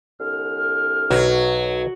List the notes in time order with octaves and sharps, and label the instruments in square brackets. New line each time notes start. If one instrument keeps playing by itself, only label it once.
[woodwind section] C2 D3 F6
[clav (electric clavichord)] B1 [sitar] F#3